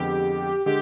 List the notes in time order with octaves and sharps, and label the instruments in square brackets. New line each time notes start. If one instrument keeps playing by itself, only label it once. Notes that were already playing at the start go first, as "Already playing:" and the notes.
Already playing: [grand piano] F2 D3 G#3 B3 [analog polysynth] G4
[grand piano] D3 G#3 [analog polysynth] G4